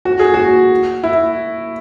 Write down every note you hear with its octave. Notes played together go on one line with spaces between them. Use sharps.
F#4
G#4
F#4
E4